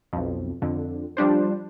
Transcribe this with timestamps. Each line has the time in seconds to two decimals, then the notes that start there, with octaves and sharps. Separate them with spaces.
0.13 B1 F2
0.62 F2 D3
1.17 F3 G3 D4 C5